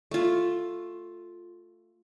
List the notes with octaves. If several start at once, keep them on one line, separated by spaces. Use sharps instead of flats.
A3 F4